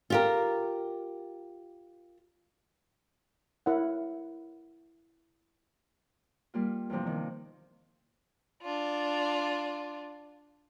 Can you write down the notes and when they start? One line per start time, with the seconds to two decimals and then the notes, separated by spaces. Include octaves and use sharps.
0.10 F4 G4 A#4
3.66 E4 A#4 C#5 F#5
6.54 G3 A#3 F4
6.90 E2 G2 C3 F3
7.07 D#3
8.62 D4 F4